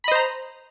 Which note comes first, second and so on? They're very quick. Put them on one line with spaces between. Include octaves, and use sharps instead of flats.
B5 D#5 C5 A#5